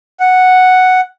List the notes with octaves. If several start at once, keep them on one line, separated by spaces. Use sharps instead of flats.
F#5